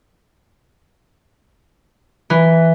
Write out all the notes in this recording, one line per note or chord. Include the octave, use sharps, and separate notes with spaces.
E3